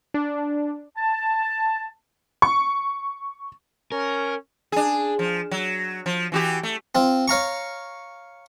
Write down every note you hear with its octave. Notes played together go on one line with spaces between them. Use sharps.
D4
A5
C#6
C#4 A#4
D4 G#4
F3
F#3
F3
E3 F#4 G4
A3
C4 F4
C#5 F5 A#5 C#6